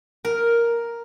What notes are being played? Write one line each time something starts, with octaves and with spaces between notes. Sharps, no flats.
A#4